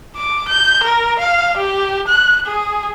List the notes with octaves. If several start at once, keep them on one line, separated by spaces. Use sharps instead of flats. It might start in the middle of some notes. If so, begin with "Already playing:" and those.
D6
G6
A#4
F5
G4
F#6
G#4